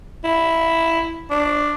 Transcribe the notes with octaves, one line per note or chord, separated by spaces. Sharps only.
E4
D4